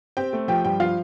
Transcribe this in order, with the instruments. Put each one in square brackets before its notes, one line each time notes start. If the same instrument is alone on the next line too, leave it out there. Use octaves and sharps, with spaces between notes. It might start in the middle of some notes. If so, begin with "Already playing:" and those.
[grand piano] C4 [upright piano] G4 G5
[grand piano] A3
[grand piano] F3 [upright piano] G4 G5
[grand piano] G2 [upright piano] G4 G5
[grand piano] F3 [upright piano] F4 F5